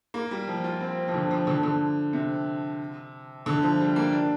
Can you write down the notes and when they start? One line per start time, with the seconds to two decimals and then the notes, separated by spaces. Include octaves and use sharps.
0.14 A#3
0.31 G3
0.48 F3
0.64 F4
0.81 C4
1.08 F3
1.14 D3
1.31 F3
1.47 D3
1.55 F3
1.63 D3
2.13 C3
3.46 D3
3.62 F3
3.80 G3
3.96 A#3
4.12 D4